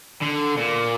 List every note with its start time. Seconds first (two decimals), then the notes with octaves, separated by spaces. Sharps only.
0.22 D3
0.57 A#2